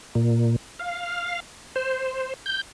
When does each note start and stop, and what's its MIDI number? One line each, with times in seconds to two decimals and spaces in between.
0.15 0.56 46
0.79 1.40 77
1.76 2.34 72
2.46 2.61 91